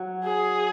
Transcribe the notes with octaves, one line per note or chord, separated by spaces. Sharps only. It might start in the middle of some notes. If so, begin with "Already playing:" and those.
Already playing: F#3
G#4